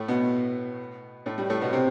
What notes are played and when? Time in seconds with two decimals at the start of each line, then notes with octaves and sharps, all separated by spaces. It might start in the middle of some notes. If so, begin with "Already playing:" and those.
Already playing: A2 A3
0.08 B2 B3
1.26 A2 A3
1.38 G3
1.50 A2 A3
1.61 B2 B3
1.73 C3 C4